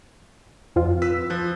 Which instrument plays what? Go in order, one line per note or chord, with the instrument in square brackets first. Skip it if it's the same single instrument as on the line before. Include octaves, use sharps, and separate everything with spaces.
[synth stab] F2 F4
[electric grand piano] B4 E6 B6
F3 F#6